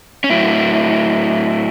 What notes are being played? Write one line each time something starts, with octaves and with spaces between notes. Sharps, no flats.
C#4
A2 F#3 E4